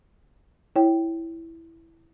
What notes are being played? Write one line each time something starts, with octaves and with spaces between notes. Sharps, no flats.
E4 C#5 G5